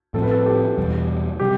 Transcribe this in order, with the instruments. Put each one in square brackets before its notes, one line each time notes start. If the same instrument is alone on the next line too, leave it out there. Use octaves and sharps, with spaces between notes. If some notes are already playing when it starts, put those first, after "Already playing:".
[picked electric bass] A2 F3 C4 [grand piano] A4
[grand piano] B4
A4
G4
[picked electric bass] E2 B2 G3
[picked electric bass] C3 G3 [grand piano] G4